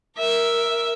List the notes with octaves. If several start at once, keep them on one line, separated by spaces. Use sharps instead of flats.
A#4 E5